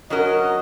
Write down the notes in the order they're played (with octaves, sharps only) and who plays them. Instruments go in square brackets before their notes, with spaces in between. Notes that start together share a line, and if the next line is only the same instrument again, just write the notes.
[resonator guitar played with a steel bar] F#3 C#4 F#4 A#4 [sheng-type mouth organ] D#5